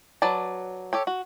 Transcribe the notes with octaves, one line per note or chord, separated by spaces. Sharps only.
F#3 B4 D5 A5
G4 A4 C#5
F#4